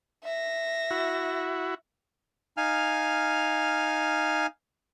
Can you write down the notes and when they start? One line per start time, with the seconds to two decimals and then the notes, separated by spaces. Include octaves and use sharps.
0.24 E5 A#6
0.91 E4 F#4
2.57 D#4 F5 G#5 F6